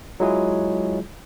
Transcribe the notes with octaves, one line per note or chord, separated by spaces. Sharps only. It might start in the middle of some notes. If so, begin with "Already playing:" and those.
F#3 G#3 E4 F4 G#4